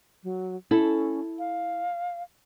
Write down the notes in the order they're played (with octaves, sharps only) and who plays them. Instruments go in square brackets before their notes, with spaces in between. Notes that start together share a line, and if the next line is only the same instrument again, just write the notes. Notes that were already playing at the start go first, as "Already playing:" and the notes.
[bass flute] F#3
[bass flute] C#4 [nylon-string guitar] E4 A4
[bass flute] F5